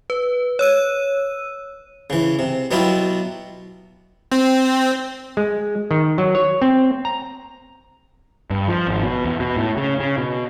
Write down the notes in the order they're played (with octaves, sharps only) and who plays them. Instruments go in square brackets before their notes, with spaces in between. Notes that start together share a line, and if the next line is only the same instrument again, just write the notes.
[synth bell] B4
C#5 E6 D#7
[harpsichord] C#3 E3
C3
B2 F#3 B3 E4 F4 G4
[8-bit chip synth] C4
[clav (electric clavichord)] G#3
D#3
F#3
C#5
C4
A#5
[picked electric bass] G2
F3
G#1
B2
E2
B2
A2
C#3
C#3
B2